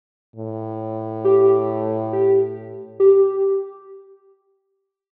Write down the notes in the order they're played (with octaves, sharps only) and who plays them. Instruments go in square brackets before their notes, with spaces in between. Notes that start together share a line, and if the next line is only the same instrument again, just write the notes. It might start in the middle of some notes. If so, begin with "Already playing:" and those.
[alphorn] A2
[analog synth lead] G4
G4
G4